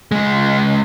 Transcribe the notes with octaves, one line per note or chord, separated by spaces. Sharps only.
C#2 G#3